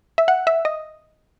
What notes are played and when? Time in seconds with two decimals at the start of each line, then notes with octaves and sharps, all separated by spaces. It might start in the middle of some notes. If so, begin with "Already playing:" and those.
0.18 E5
0.28 F#5
0.47 E5
0.65 D#5